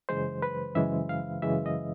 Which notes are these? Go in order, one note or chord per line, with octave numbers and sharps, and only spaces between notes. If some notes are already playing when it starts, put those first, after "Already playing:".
F#2 C#3 E3 G#3 C5
B4
F#2 C#3 E3 G#3 E5
F5
F#2 C#3 E3 G#3 E5
D#5